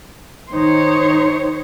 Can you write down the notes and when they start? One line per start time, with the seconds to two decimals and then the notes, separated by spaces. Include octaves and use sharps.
0.51 D#3 D#4 C5 C#5